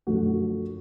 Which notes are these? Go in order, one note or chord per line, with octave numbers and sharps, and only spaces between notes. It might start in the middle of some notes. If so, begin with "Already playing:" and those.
F#2 D3 F3 A3 F#4